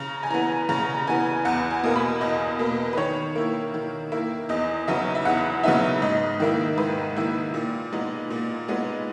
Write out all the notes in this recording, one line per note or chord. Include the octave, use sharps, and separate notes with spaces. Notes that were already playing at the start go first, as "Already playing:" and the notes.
Already playing: C#3 A#5
G#5
E3 B3 A#5
C#3 A#5
E3 B3 G#5
E2 F#5
G#5
B2 A#3
B5
E2 D#5
B2 A#3
B4
D#3 C#5
A#3 E4
D#3
A#3 E4
E2 D#5
C#3 F#3 B3 D#4 E5
E5
E2 F#5
C#3 F#3 B3 D#4 E5
G#2 D#5
D#3 A#3 E4
G#2 B4
D#3 A#3 E4
A#2
G#3 B3 D#4
A#2
G#3 B3 D#4